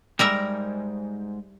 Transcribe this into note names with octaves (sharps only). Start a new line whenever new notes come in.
G#2 G3 A#4 E5